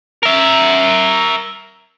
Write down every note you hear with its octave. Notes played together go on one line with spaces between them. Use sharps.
A#4 E5